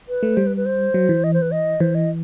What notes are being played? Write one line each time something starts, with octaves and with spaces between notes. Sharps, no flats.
B4
A3
G3 C5
B4
B4
C5
F#3
E3
D#5
C5
B4
D#5
E3 C5
D#5